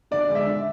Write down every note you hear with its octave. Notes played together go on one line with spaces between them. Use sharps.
D3 D5
G#3
E5
D3